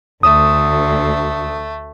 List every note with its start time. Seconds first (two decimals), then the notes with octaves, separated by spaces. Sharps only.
0.23 D2 A3 D#6